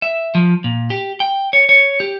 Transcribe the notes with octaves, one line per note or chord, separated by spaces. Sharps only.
E5
F3
A#2
G4
G5
C#5
C#5
G4